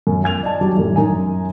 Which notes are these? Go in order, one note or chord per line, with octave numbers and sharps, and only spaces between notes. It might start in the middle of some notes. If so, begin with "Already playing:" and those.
F#2
G#5 G#6 F7
D5 D#5 A5
F#3 G3 G4
A1 F#2
F#2 D#4 G#5